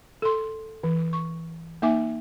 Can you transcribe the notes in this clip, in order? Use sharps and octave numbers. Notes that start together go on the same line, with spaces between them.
A4 C6
E3
C#6
A#3 D#4 E5 G#5 D6